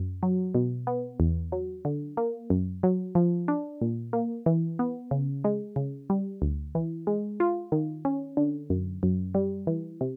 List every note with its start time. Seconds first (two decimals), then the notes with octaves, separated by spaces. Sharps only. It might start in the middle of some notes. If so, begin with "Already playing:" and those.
Already playing: F#2
0.23 F#3
0.55 B2
0.87 B3
1.20 E2
1.52 F#3
1.85 D3
2.17 A#3
2.50 F#2
2.83 F#3
3.15 F3
3.48 D4
3.81 A#2
4.13 A#3
4.46 E3
4.79 B3
5.11 C#3
5.44 G#3
5.76 C#3
6.10 G3
6.42 D2
6.75 E3
7.07 G#3
7.40 F4
7.72 D#3
8.05 C#4
8.37 D3
8.70 F#2
9.03 F#2
9.35 G3
9.67 E3
10.01 C3